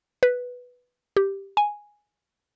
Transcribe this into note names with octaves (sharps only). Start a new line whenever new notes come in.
B4
G4
G#5